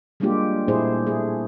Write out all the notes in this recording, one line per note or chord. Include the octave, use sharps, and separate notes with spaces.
G3 G#3 A#3 D4 F4 G4
A#2 A3 E4 G#4 C5
A3 G#4